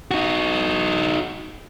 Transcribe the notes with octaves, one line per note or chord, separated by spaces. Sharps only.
D#4 F#4